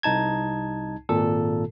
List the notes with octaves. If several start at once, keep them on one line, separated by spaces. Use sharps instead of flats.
C2 D#4 A5 G#6
G#1 A#2 A4